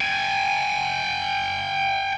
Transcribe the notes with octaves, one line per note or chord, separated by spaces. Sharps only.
G5 G#5